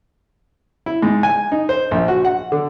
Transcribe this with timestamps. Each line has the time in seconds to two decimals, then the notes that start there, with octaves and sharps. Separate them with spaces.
0.86 E4
1.02 G#2
1.23 G#5
1.52 D#4
1.69 C5
1.91 A#1
2.08 F#4
2.25 F#5
2.52 D3